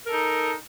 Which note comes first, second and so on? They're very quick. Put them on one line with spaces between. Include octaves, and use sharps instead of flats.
A#4 A4 D#4